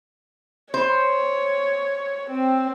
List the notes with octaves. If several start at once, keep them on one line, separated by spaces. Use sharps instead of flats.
C5 C#5
C4